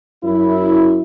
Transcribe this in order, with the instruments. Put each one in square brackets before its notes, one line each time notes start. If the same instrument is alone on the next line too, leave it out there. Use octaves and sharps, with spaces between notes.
[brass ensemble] F#2 E4